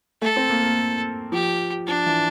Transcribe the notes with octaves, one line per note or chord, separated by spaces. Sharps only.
A3 A4
C4
A#3
A#3
F3 G4
F3 D4
E3